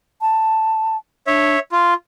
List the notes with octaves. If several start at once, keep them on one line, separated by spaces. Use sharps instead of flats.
A5
D4 C#5 E5
F4 C6